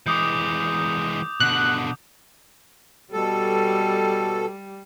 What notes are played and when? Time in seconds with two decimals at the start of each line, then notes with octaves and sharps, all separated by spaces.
0.06 E3 G#3 D6 D#6 G6
1.40 B2 D3 F#6
3.13 B2 G3 A4